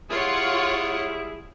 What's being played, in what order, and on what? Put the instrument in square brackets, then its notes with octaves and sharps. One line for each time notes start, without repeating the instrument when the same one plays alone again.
[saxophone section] G3 E4 G#4 [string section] F4 C#5 F#5